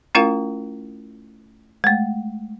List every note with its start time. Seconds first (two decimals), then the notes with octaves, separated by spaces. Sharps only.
0.15 A3 C#4 E4 F4 A#4 F5
1.84 G#3 A3